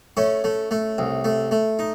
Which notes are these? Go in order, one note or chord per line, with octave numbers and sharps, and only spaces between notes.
A3 C#4
A3
A3
C2
A3
A3
D#4